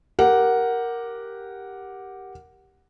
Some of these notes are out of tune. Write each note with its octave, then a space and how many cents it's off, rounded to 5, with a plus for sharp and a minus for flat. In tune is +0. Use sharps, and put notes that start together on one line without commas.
G4 +0 A#4 +0 F#5 +0